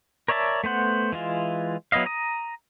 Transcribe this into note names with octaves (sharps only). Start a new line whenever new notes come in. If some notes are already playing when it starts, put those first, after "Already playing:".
A#4 C#5 D5 E5 A5
A3 B3 C5 F#5
E3 G#3 F4
F#3 B3 E4 D#5 F5
A#5 D#6